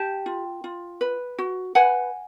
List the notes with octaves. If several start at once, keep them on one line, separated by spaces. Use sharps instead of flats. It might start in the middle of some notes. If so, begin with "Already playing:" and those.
Already playing: G4 G5 A5
F4
F4
B4
F#4
B4 F#5 G#5